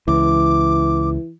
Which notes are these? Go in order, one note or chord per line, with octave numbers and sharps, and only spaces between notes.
C#2 E3 D6